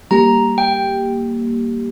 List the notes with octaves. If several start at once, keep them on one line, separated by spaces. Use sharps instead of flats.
G3 A#3 G4 A#5
G5